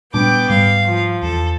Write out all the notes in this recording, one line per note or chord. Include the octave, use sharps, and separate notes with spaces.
A#2 G3 B3 D4 G5 D6
G#2 G3 F5
F3
E2 A4